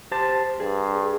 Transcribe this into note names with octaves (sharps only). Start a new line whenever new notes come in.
G4 C5 A5
G2 G#4